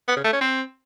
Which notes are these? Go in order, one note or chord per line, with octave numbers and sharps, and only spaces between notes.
B3
C#3
A3
C#4
C4